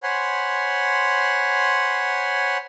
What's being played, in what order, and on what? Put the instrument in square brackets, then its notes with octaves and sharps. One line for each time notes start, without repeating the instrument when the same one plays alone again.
[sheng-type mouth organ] C5 C#5 F#5 G#5 B5 C6